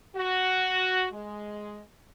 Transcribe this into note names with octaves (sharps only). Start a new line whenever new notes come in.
F#4
G#3